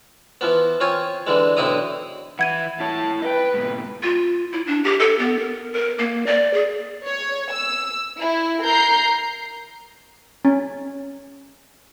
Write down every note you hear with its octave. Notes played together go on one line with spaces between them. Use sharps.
E3 F3 B3
C4 F4 C#5 G#5
D3 E3 G#3
B1 D3 C4 E4 A#5 D#6
E3 E4 F#5 G#6 D#7
E4 C#5 A5
B4 D#5 G5
G#2 B2
F4
E4
D4
G4
A4
B3
A#4
A#4
A#3
D5
G#4
C#5
E6
E4
A#4 A#5 G6 C7
C#4